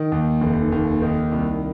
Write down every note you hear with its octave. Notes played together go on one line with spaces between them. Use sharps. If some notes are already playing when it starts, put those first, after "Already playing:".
Already playing: D#3
D#2
F1
D#2
D#3
C2